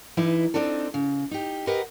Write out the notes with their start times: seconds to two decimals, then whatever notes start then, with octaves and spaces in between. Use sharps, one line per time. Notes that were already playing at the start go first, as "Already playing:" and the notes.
0.17 E3 D#4 E4 B4 D#5
0.54 C4 D4 D#4 A4
0.94 C#3
1.31 D#4 G4
1.67 G4 A#4 B4 D#5 F#5